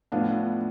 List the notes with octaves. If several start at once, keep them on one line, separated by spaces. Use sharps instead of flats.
A2 F3 B3 D4 F5